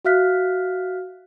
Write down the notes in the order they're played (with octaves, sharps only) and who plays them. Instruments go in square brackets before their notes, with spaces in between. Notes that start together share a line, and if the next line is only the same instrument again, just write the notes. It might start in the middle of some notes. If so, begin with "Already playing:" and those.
[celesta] F#4 E5 F5 F6 F#6 B6